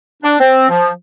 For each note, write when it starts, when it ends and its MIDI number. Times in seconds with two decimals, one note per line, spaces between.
0.23 0.35 62
0.40 0.68 60
0.69 0.89 53